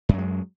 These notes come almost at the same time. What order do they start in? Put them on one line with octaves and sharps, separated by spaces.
F#2 F#3 G#3